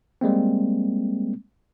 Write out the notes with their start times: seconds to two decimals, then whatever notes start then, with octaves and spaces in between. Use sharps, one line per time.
0.21 G3 G#3 A#3 C4